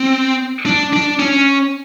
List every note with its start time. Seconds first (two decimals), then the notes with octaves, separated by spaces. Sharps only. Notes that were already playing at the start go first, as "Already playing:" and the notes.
Already playing: C4
0.66 D4
0.93 D4
1.19 C#4